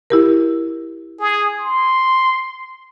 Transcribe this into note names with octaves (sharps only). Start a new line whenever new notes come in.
E4 G4 A#4
G#4
C6